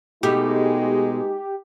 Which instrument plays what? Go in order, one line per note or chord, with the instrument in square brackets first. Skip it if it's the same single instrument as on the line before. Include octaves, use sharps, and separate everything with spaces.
[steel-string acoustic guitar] B2 A3 [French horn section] G#3 D#4 [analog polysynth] G4